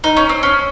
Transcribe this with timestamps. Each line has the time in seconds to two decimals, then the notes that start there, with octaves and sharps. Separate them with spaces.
0.04 D#4
0.17 C#4
0.29 C4
0.43 C#4